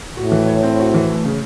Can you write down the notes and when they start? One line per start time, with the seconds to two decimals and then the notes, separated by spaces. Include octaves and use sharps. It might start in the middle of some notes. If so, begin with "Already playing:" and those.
0.16 A2 F#4
0.32 E3
0.47 C#5
0.63 C4
0.79 F#4
0.94 E3
1.09 A3
1.25 C#3